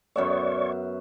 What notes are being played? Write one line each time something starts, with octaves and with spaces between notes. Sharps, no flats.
F#2 B3 C#5 D5 E5 C#6